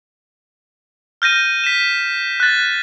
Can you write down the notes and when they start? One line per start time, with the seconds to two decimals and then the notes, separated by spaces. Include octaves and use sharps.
1.22 F6 G6 A#6 D#7
1.64 B6 E7
2.40 F#6 A6